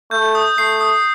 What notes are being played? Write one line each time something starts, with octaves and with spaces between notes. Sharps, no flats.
A3 G6
D#6
A3 C7
D#6